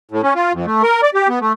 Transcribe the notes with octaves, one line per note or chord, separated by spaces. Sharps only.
A2
C#4
F4
F2
A3
A#4
D5
G4
B3
A3